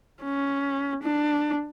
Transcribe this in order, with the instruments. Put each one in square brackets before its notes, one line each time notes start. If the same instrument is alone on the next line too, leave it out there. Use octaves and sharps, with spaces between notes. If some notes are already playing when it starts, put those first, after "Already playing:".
[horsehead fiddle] C#4
D4